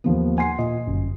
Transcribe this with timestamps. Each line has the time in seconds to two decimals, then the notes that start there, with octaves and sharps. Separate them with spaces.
0.04 D#2 F3 B3
0.38 F#5 G#5 C6 C7
0.59 A#2 D#5
0.87 G1 F#2